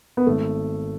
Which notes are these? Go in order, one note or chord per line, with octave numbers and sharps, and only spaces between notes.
B3
G#1 A3